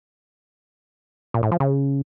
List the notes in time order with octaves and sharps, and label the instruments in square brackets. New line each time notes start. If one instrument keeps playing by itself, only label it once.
[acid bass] A#2
A2
F3
C#3